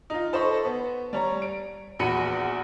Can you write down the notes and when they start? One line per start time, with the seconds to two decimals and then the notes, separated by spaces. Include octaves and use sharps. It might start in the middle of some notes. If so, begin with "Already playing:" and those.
0.10 D#4 F4
0.33 A4 C5 D#5 B5 C#6
0.65 B3
1.13 G3 C#5 A#5
1.42 D7
1.99 A#1 E2 F#4 B5 C#7 D#7